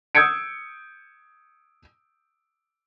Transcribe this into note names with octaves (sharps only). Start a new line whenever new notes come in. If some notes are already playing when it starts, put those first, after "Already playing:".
D#6 E6 G6 G#6 C#7 D7